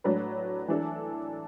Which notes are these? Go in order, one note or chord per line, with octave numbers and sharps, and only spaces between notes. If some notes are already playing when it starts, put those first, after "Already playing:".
A2 F#3 D4 B4
E3 D4 A4